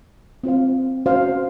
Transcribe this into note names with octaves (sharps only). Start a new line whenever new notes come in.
C4 F4 C5 F5
C#4 F#4 C5 F5